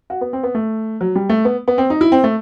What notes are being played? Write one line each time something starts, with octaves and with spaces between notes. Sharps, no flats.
F#4
B3
C4
B3
A3
F#3
G3
A3
B3
B3
C4
D#4
E4
C4
A3